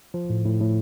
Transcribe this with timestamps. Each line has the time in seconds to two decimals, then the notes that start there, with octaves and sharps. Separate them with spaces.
0.14 F3
0.30 A2
0.45 A2
0.60 A2